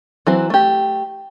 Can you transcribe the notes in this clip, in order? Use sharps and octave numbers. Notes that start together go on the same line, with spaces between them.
E3 F#3 C4
A3 G4